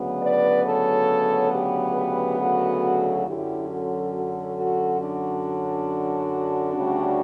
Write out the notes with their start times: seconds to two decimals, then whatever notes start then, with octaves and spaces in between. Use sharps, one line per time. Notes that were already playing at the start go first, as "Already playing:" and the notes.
Already playing: D2 C#3 F#3 B3
0.21 B4 D5
0.65 A4 C#5
1.52 G4 B4
1.95 G4 B4
2.39 F#4 A4
3.27 F#2 D3 F#3 C#4 E4 G4
3.70 F#4 A4
4.13 F#4 A4
4.56 F#4 A4
5.00 D4 F#4
6.74 D2 C#3 G3 C#4